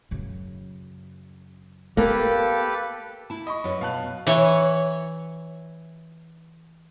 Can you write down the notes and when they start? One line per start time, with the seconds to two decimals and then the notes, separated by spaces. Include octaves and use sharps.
0.11 F#2 C#3
1.97 A#3 B3 G4 A4 B4
3.30 E4 A5
3.47 D#5 B5 C#6
3.64 F#2 B4
3.81 B2 F5 A5 F#6
4.27 E3 C#5